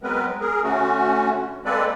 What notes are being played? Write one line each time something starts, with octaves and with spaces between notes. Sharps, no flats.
F#3 G#3 B3 C4 A#4 B4
G#4 A#4
D3 A3 C#4 F#4
G#3 A#3 C4 A4 B4 D5